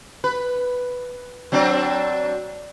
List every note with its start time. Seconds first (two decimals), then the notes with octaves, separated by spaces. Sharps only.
0.24 B4
1.52 F#3 C4 D4